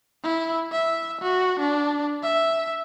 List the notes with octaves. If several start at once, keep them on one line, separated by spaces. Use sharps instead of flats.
E4
E5
F#4
D4
E5